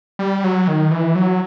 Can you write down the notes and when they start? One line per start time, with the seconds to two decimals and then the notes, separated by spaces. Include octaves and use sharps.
0.19 G3
0.44 F#3
0.68 D#3
0.91 E3
1.15 F#3